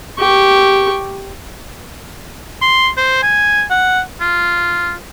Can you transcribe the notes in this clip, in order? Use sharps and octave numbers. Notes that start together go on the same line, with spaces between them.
G4 C#6
C6
C5
G#5
F#5
F4